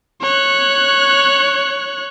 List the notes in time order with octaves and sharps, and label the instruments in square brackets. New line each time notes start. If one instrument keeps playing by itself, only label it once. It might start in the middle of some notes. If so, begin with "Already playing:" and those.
[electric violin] C#5 F#6